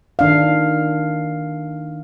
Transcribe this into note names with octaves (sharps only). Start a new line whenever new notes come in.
D#3 D4 F5